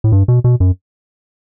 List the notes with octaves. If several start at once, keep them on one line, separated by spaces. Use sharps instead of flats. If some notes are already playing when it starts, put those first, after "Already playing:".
A2
G2
B2
B2
F#2